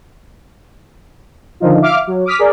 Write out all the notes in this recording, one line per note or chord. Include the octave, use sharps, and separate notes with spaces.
D3 D#3 F3 D#4 F4
E5 F5 D6 F6
F#3
D6 D#6 F6 B6
G#4 A#4 D5